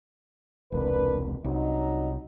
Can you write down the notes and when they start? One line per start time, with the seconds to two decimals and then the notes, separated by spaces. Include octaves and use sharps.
0.72 E1 C2 D4 A#4 B4
1.44 C2 F#3 D4 D#4